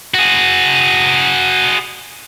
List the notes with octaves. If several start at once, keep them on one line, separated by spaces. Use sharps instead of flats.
F#4 G#4